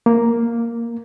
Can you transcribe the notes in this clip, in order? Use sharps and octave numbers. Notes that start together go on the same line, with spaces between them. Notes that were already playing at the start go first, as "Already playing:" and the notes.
A#3